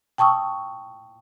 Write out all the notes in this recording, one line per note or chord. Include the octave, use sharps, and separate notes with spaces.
G5 A5 C#6 D#6 E6